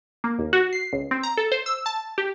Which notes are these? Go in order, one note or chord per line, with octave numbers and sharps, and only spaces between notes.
A#3
D#2
F#4
C7
C#2
C4
A#5
A4
C5
E6
A5
G4